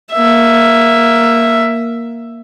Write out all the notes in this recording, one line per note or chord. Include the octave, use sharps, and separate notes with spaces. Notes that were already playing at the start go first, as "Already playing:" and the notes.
A#3 E5